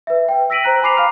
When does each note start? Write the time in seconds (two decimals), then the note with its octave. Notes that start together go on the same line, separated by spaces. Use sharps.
0.07 B4 E5
0.28 G5
0.50 E6 A#6 B6 D7 D#7 F#7
0.64 C5 A#5 F#6
0.82 G#5 A#5 B5 D6 C7 F7
0.97 F5 A#5 D6 F6